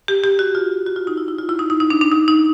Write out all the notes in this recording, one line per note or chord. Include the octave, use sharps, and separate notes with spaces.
G4
G4
F#4
F4
F#4
F4
D#4
E4
E4
F4
E4
D#4
D#4
D#4
D4
D4
D#4
D#4